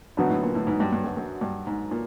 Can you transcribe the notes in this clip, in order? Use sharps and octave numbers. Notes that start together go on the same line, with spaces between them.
G#2 D3 F#3 B3 D#4 F#4
A2
A#2
A2
G#2
G2
G2
F#2
F#2
G2
G#2
A#2